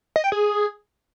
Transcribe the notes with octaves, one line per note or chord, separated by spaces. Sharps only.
D#5
G5
G#4